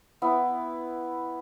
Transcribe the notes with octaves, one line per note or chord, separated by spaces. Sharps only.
B3 E4